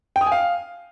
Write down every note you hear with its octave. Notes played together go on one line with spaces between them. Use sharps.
G5
D#6
G#5
F5